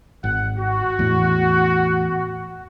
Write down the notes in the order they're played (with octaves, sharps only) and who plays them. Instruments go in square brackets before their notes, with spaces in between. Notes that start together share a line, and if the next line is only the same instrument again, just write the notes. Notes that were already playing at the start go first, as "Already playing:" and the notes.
[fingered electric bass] G#1 [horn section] F#5
[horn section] F#4
[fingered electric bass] E2 A2